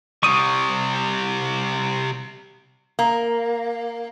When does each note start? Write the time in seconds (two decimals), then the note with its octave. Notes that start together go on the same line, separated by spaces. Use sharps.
0.23 C3 G3 C#6 D#6
2.99 A#3